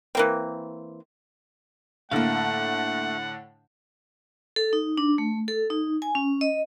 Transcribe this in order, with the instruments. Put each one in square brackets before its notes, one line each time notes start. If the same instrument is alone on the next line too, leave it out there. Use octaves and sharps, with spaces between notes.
[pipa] E3 A#3 C4
[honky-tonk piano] A2 D3 [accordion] A3 [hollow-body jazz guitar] A#3 F5 [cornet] F#5
[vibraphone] A4
D#4
D4
A3
A4
D#4
G#5
C#4
D#5